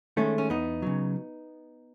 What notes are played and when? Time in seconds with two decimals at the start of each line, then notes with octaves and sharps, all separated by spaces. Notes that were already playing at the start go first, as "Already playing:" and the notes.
0.17 D#3 G#3 A3 C#4
0.38 C#4
0.50 E2 B3 D#4
0.82 C#3 F#3